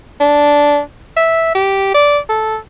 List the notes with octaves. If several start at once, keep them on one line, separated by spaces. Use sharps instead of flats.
D4
E5
G4
D5
A4